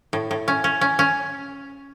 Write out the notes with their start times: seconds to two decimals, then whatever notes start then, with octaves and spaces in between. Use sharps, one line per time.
0.13 A2
0.31 A2
0.48 C#4
0.64 C#4
0.81 C#4
0.99 C#4